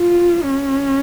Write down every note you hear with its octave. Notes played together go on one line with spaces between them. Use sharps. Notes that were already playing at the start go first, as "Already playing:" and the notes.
Already playing: F4
C#4